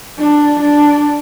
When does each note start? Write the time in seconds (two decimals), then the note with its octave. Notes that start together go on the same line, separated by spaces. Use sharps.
0.18 D4
0.60 D4